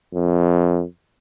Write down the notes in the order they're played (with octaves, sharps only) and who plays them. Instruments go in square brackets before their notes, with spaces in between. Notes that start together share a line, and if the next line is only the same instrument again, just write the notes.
[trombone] F2